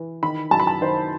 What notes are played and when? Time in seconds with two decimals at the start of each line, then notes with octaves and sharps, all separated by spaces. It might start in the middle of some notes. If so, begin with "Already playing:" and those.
Already playing: E3
0.23 D#3 B5
0.51 F#2 A5
0.60 B5
0.67 A5
0.81 D#3 C5